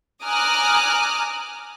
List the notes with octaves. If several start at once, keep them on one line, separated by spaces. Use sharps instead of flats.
G#5 A#5 D6 D#6 F6 F#6